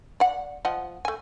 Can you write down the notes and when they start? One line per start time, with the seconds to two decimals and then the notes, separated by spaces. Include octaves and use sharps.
0.20 D5 F#5
0.65 F3 D#5 F#5
1.05 A3 G#5